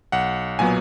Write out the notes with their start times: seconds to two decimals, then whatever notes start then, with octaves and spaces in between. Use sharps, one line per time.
0.12 B1 F#5
0.59 A#2 F#3 B3 G#5